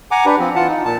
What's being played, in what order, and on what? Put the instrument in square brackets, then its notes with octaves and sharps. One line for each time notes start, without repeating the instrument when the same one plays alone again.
[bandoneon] F#5 G#5 A#5 D6
D4 G4 B4
F3 C4
E3 F4 F#5 A5
D#4
A#2 A5